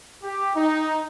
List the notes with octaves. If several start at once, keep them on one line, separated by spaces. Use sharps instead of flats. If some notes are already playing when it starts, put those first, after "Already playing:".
G4
D#4